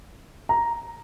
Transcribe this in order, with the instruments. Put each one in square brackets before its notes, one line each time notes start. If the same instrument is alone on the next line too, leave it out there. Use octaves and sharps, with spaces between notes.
[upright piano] A#5